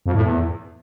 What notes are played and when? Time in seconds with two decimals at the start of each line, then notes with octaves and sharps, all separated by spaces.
0.06 F2
0.15 A2
0.24 E2